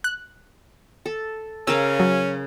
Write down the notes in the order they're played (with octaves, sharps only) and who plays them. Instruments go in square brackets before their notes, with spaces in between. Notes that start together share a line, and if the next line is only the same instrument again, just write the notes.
[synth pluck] F#6
[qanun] A4
[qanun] C#3 A#4 F5 [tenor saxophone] C#4 [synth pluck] E6
[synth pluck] F#3